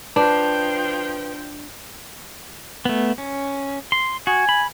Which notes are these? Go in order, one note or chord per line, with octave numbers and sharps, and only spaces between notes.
F3 D4 B4 G5
A3 B3
C#4
C6
F#4 G#5
B5